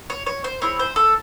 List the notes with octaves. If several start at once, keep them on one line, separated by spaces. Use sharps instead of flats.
C#5
C#5
C5
C4 E4 G#4 C#5
C5
A4